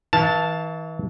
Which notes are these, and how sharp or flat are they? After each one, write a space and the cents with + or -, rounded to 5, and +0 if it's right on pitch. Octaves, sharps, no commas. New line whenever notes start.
E3 -40 F5 +0 A5 +0